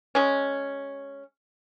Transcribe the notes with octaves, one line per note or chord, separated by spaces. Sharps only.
G#3 C#4